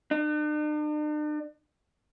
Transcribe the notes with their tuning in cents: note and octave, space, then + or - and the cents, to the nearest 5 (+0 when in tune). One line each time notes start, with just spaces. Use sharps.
D4 +45